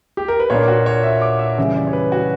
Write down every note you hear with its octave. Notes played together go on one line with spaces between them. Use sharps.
G4
A#4
B4
A#2 A#3 D4 C#5
F#4
C#5
E5
D6
E5
C#3 E3 G3 E5
D5
C#5
B4
F#4